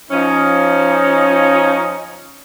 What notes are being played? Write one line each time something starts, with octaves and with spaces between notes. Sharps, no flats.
F3 C#4 D#4